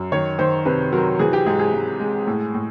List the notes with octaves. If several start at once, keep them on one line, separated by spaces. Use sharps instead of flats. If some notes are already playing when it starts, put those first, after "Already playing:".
Already playing: F#2
D#3 C#5
D#3 C5
C3 B4
F#3 A#4
E3 G#4
G4
G#2 G#4
G#4
G#2
G#3
A2
A2